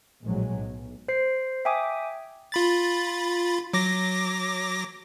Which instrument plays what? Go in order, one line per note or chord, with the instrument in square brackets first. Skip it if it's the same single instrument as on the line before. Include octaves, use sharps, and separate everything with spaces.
[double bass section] A#1 A2 F#3 G#3
B1
[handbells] C5 C7
E5 G5 G#5 D6 D#6
[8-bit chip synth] F4 B5 A6
F#3 D6 A#6